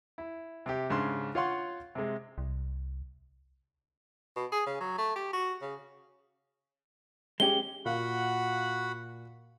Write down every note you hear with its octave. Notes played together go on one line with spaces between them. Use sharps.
E4
C3 G4
G#2 C#3 D4 C6
F4 C#5 F5 F#5 C6 C#6
C3 G#3
C2
B2
G#4
C#3
F#3
A3
G4
F#4
C#3
G#3 C#4 G4 G7
A#2 F#4 F5 F#5 B5